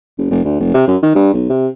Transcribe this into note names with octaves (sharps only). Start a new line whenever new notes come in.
F#1
F1
D2
F1
C3
F#2
D#3
G2
B1
C3